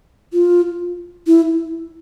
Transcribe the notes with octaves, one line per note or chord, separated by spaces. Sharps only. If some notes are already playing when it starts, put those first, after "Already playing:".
F4
E4